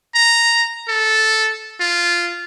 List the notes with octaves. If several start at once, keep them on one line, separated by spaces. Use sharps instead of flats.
A#5
A4
F4